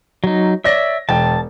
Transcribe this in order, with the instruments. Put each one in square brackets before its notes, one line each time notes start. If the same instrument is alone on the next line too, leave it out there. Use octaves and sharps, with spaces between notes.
[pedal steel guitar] F#3 D#4
[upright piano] C#5 D5 A#6 [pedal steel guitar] E5
[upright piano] E1 G5 [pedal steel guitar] A5